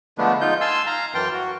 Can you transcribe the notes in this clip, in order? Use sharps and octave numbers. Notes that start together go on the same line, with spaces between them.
D3 F3 G#3 A3 B3 D4
G#3 D#4 F4 G6
F5 G#5 A5 C6 E6
F5 A#5
F#2 E3 G5 A5 C6 F6
F#4